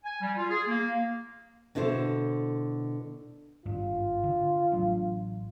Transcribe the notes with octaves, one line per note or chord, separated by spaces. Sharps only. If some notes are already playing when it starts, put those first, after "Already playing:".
G#5
G3
F4
G#4
A#3
B2 D3 E4 A4 C5
G#1 G2 F4
D3
A1 F#3 D4